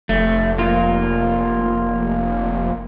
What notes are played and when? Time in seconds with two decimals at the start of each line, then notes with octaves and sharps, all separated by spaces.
0.09 F1 A3
0.58 A#3 F4